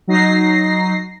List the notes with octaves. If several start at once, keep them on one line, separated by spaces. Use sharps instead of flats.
F#3 D#4 A#6 C7